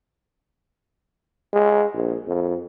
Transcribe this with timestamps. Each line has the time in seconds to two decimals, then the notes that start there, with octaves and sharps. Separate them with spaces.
1.53 G#3
1.95 A#1
2.28 F2